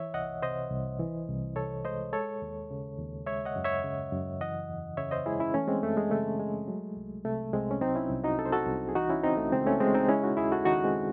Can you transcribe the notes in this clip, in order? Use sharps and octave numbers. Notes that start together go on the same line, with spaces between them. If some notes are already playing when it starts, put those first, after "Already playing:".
Already playing: E3 C#5 E5
C2 D#5 F#5
C3 C5 D#5
C2
E3
C2
C3 A4 C#5
G#3 C5 D#5
G#3 A4 C#5
D#2
C#3
D#2
G#3 C#5 E5
D#5 F#5
F#2
C#5 E5
C#3
F#2
E3 D#5 F#5
E2
C#3 C#5 E5
C5 D#5
G#3 E4 G#4
C#4 E4
E3 A3 C#4
G#3 C4
F#2 A3
G#3
C#3 A3
G#3
F#3
C2
C3 A3
C2 G#3 C4
C#4
F#3 C4 D#4
C#4 E4
C2
D#4 F#4
C3 A4
C5
F#4 A4
C2
G#4
E3 D#4 F#4
C#4 E4
C#2 C4 D#4
A3
C#3 G#3 C4
A3 C#4
G#3 C4
C4 D#4
G#3 C#4 E4
D#4 F#4
D#2 E4 G#4
F#4 A4
D#3 D#4 F#4
G#3 C4